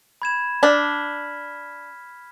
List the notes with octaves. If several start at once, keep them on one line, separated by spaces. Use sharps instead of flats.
B5 G#6 E7
D4 F6 B6